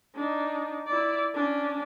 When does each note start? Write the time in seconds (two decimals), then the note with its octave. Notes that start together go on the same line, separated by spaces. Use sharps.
0.15 D4 D#4
0.87 E4 D5
1.34 C#4 D4